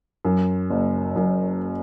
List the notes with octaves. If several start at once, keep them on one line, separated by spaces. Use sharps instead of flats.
F#2
F#1
F#2